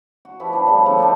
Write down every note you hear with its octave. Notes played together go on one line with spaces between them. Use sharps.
F#4
F3 E4 G4 B4
D4 C5
C#3 F3 G3 B3
D3 F3 A3
D4 D#4 C5 D#5